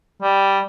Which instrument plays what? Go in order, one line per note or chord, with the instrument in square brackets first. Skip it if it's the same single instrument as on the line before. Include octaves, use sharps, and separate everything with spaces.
[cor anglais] G3